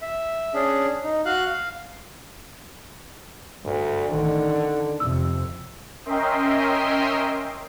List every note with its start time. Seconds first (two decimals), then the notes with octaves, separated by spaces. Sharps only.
0.02 E5
0.54 C#4 D4 G#4
1.04 D#4
1.25 F#4 F5 F#6
1.46 F5
3.64 D2 G2
4.09 A1 D3 D#3
5.00 F2 C3 F3 E6
6.05 C#4 A#4 D#5 E5 G5 C6